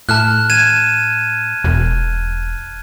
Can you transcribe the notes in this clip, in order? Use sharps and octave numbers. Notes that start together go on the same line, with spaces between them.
A2 A5 F6 F#6
G#6 D#7 E7
E1